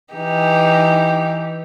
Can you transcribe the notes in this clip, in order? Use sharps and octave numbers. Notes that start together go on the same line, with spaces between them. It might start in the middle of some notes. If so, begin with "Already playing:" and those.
E3 D#4 G4